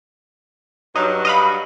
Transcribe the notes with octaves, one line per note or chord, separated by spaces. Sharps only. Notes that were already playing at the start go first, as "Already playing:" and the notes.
G2 F#3 D#4
D#5 F5 B5